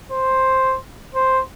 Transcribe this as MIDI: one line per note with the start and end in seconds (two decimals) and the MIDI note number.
0.11 0.77 72
1.15 1.41 72